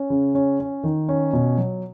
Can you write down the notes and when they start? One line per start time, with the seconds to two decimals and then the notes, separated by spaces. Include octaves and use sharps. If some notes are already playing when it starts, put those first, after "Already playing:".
Already playing: C#4
0.10 C#3
0.35 C#4
0.60 C#4
0.84 D#3
1.09 C#4
1.33 B2
1.58 F#3